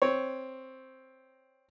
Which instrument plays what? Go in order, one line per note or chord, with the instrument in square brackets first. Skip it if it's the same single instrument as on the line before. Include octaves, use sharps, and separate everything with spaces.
[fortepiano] C4 C#5